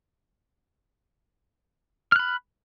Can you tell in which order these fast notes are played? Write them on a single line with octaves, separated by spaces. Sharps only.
F6 F#6 B5